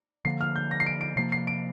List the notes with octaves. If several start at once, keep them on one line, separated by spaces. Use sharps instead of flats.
D3 F3 A#3 C7
F6
G6
A#6
C7
D7
D7
C3 F3 A#3 C7
C7
D7